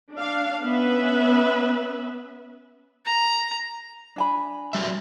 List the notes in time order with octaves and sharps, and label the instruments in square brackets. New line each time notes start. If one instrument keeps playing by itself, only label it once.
[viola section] D4 F5
B3 C#4 B4 E5
[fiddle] A#5
[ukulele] D4 G#5 B5
[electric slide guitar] F#3 G3 E5